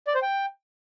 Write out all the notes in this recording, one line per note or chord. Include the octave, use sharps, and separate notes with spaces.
D5
C5
G5